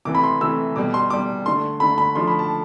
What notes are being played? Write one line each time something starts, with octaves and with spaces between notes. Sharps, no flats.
C3 E3 A3 D6
B5
C6
C3 E3 A3 E6
B2 G3 D6
C6
B2 G3 D6
D3 A3 C6
D3 A3 B5
B5
D3 F3 A3 C6
B5
A5